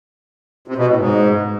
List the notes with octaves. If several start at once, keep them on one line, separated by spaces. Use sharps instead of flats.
C3
B2
A2
G#2